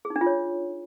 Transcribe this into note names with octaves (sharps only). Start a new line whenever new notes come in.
G#4
D#4
D4
F4
C#5